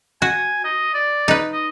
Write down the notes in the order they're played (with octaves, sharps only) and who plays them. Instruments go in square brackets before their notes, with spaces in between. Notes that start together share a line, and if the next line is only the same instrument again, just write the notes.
[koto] F#4 [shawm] G#5
[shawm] D#5
D5
[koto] D#4 B4
[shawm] D#5